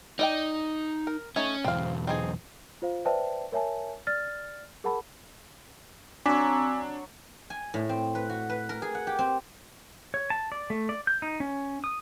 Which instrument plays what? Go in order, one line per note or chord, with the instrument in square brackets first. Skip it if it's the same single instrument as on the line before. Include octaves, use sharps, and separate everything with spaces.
[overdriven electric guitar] D#4 [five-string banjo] D5 D#5 G5
[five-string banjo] A#4
[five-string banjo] A3 D#4 C#5 [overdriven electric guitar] C#4
[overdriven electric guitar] B1 E2 [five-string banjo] C4 F5
[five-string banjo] C4 D#4 G#4
[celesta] F4 C5 F5
B4 C5 D5 E5 G5 A5
A#4 C#5 E5 G#5 A5
D5 F6 A6
G#4 A#4 F#5 A5 B5
[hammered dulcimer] F#3 C#5 [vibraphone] C4 E6 [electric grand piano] D4 [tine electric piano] G#5 D6 B6
[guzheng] G#5
A2
C4
B4
F#4
B4
A#4
G#4
F#5
G4
C4
[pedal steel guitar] C#5
A5
D5
A3
D5
G6
D#4
C#4
D#6